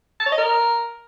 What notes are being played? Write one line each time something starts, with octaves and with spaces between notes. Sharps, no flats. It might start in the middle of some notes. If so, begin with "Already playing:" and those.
A5
C#5
D#5
A#4